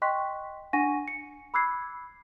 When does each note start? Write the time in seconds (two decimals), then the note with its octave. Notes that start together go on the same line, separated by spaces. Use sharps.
0.02 D#5 G5 C6 C#6 F#6 B6
0.73 D4 F#5 G#5 C#6 A#6 D#7
1.08 C#7
1.54 B5 D6 E6 F#6 G#6 C7